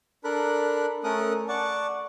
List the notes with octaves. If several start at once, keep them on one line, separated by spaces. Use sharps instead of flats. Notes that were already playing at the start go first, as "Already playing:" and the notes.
D4 A4 A#4 B5 F#6
A3 C#4 A4 A#4 D#6 F#6
D5 F#5 A5 C#6